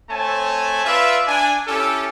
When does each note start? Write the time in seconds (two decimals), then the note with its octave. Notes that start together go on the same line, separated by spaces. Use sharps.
0.10 A3 C4 C#5 G#5 A5
0.86 F4 B4 D5 E5
1.28 D4 G#5
1.67 C#4 E4 G4 A4